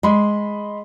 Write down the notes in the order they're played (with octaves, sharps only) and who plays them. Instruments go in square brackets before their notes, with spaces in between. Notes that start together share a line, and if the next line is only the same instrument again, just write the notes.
[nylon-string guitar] G#3 [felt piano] D#5 B5 C6